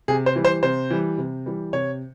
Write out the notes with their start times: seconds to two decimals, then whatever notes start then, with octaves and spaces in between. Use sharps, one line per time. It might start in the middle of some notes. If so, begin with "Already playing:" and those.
0.08 C3 G#4
0.26 C5
0.36 E3 G3
0.45 C5
0.63 C3 C5
0.91 E3 G3
1.18 C3
1.46 E3 G3
1.73 C3 C#5